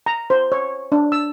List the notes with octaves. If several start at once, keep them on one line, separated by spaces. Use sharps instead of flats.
A#5
C5
C#5
D4
E6